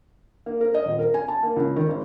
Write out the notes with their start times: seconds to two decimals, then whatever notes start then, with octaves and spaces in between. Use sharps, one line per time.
0.46 A#3
0.61 A#4
0.74 D#5
0.86 D#1
0.99 A#4
1.14 G#5
1.28 A5
1.43 A#3
1.56 C#2
1.76 D#3
1.89 G#1